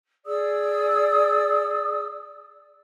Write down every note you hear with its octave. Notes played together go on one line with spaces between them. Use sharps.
G#4 D5 D#6 E6